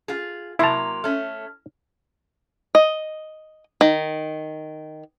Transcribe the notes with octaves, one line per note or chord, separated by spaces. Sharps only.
F4 G#4
C3 F#3 A#3 E4 A5 C6 F7
A3 C#4 F6
D#5
D#3